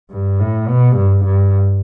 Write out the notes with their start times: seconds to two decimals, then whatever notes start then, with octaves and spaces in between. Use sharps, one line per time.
0.11 G2
0.40 A2
0.68 B2
0.97 G2
1.25 G2